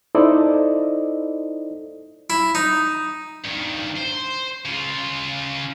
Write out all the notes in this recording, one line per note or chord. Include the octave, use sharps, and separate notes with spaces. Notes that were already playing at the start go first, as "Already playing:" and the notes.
D#4 E4 A4 C5 D5 D#5
E4
D#4
G2 D#3
C5
C#3 F4